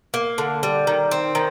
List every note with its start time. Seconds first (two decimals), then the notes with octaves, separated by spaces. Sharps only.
0.14 A#3
0.38 D3
0.63 G3
0.87 D#3
1.11 C4
1.35 D#3